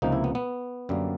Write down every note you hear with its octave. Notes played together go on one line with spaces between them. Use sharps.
C#2 C3 F3 A#3 D#4
E4
B3
B3
F#2 D3 G3 A#3